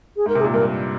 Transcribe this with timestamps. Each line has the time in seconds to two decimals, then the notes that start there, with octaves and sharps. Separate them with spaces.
0.17 G#4
0.26 G#2 A#4
0.35 C3
0.41 G#4
0.44 A#2
0.53 G2 A#4